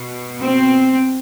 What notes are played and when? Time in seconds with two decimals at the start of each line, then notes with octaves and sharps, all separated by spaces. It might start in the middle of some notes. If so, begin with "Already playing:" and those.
Already playing: B2
0.40 C4